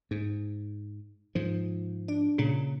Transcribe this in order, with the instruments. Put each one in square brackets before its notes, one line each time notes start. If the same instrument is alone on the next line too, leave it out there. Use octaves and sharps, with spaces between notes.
[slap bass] G#2
G#2 F3
[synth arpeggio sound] D4
[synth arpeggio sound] A#2 [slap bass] C#3